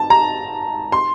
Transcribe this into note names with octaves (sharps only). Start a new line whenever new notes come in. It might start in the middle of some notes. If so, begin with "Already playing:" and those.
Already playing: A5
A#5
C6